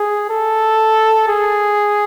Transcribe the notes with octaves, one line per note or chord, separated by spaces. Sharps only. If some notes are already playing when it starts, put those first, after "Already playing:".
Already playing: G#4
A4
G#4